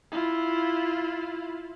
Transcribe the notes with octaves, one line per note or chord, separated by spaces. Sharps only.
E4 F4